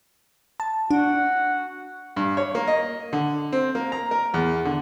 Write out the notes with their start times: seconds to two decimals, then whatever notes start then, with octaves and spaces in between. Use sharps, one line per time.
0.60 A5
0.91 D4 F#4
2.17 G2
2.37 C#5
2.55 A#3
2.67 D#5
3.13 D3
3.53 C4
3.75 A#3
3.92 A#5
4.11 A#4
4.34 E2
4.65 D3